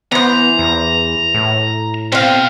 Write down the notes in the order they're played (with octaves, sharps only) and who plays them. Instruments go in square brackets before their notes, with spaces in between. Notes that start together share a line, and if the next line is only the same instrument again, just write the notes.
[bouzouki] E3 C5 [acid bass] B3 [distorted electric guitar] A#5
[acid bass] E2
A2
[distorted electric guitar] B2 [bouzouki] C4 F5